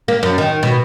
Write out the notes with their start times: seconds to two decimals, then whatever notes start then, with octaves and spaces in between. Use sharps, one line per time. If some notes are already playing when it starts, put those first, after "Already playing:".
0.08 A#3
0.23 F#2
0.38 D#3
0.63 B2